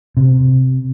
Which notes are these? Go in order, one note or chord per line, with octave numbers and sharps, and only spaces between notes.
C3